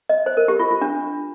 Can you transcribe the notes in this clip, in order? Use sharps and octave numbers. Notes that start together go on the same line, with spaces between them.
D#5
C5
A#4
G4
F4
F4
D4